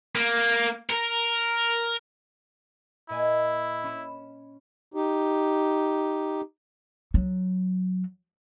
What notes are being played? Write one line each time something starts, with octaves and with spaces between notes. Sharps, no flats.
A#3
A#4
A#2 E4 D#5 G#5
C#4 B5 E7
D#4 G4
F#3